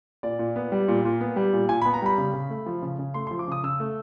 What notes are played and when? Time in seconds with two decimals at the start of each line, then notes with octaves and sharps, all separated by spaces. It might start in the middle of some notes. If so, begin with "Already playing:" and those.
0.23 A#2 D5
0.39 A#2
0.56 B3
0.72 G3
0.88 A#2
1.05 A#2
1.21 B3
1.36 G3
1.53 A#2
1.69 A#2 G#5
1.82 B5
1.85 B3
1.94 A#5
2.02 G3 B5
2.18 C#3
2.33 C#3
2.50 A3
2.66 F3
2.82 C#3
2.99 C#3
3.14 A3 C6
3.27 C6
3.31 F3
3.39 D6
3.48 C#3 D#6
3.64 C#3 E6
3.80 A3